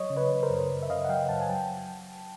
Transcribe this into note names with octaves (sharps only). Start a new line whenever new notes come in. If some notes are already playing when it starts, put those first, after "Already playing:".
Already playing: F#3 C#5 D#5
C#3
B4 C#5
C#3
A#4 C5
F#2
F#2
E5
C#3 D#5 F5
F#5
F#3 F5 G5
F#2 G5 A5
G#5
F#3 G5 A5